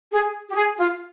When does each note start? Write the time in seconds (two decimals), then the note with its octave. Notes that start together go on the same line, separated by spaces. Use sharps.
0.12 G#4
0.50 G4
0.55 G#4
0.78 F4